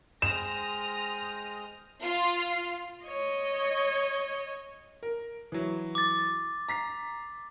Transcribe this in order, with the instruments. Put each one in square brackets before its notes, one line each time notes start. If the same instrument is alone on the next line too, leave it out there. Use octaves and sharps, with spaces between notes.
[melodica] G#3 C5 G5 [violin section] D#6 F6 A#6 [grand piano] E7
[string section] F4
[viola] C#5 D#5
[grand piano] A#4
E3 F#3
[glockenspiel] D6 A6
[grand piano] A#5 B6 C7